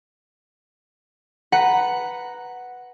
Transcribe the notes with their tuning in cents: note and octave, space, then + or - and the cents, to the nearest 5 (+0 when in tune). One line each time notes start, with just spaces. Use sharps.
B4 +0 F#5 +0 A#5 +0